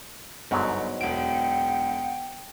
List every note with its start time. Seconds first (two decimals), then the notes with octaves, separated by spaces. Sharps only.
0.51 G1 G#2 B2 F#3
1.01 E1 F#5 G5 D7